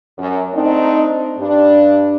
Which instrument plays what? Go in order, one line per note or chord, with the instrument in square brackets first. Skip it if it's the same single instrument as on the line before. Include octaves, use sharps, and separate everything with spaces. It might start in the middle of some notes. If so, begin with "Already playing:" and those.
[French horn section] F#2
A3 C4 D4 D#4
G2 D4